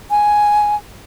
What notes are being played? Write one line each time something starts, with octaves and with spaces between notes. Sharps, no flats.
G#5